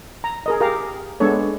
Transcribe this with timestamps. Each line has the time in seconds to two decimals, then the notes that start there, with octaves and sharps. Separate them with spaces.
0.24 A#5
0.46 G#4 A#4 D#5
0.61 G4 G#4 A#4 F5 A#5
1.20 G#3 B3 D4 A4 C#5